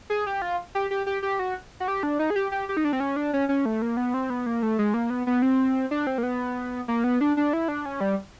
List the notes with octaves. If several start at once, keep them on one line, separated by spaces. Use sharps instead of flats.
G#4
G4
F4
G4
G4
G4
G4
F#4
F#4
G4
D4
D#4
G#4
G4
G4
G4
D#4
D4
C4
C#4
D4
C#4
C#4
A3
A#3
B3
C4
B3
A#3
A3
G#3
A#3
B3
B3
C4
D4
C4
A#3
B3
A#3
B3
D4
D4
E4
D4
C#4
G3